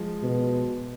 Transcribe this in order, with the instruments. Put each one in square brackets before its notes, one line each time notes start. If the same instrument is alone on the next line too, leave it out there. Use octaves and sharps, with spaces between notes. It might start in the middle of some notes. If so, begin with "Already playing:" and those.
Already playing: [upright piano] F3 G#3
[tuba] B2